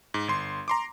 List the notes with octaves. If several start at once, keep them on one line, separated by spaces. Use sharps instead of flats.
G#2
G1 C6
A#5 C6 D6